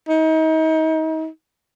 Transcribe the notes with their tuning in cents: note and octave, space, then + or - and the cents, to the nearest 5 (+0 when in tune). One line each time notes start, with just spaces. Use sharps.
D#4 +35